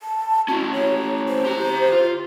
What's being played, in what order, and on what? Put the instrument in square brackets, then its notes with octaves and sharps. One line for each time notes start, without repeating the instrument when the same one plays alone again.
[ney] A5
[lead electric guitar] C#4 E4 [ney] F#4
[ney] C#5
C5
[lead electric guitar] G4 A#5
F4